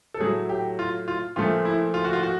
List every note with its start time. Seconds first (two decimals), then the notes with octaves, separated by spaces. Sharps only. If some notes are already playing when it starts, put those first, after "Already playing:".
0.14 A4
0.20 A2 F#3 A3 G#4
0.49 G4
0.79 F4
1.08 F4
1.36 A#2 F3 A3 F4
1.65 E4
1.94 F4
2.05 F#4
2.13 F4
2.23 F#4